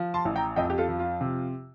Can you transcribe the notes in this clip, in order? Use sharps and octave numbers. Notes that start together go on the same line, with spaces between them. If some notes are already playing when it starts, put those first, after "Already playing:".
Already playing: F3
A5 C6
A1
G5 A#5
F2 D#5 G5
G4
F4 A4
F3
F4
C3